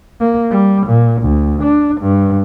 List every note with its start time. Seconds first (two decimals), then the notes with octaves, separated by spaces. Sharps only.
0.20 A#3
0.51 G3
0.87 A#2
1.22 D2
1.63 D4
2.01 G2